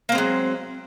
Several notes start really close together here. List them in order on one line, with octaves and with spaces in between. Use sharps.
A#3 C4 G#3 F#3